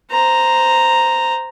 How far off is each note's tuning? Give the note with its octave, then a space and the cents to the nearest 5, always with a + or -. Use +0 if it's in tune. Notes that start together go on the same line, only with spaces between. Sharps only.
C5 -10 A#5 +0